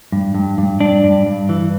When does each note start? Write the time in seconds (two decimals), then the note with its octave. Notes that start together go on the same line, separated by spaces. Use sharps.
0.12 G2
0.35 G2
0.58 G2
0.80 G2 D4
1.04 G2
1.26 G2
1.49 E3